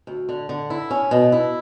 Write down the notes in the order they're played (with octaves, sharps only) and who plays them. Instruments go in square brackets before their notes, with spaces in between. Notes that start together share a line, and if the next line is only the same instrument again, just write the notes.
[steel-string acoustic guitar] D2
D3
D3
E4
C#4
B2
E4